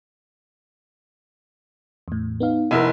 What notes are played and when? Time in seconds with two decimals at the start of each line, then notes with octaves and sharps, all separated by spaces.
2.08 E2 A2
2.40 B3 D#4 F5
2.71 F1 E4 A#4 D#5 F#5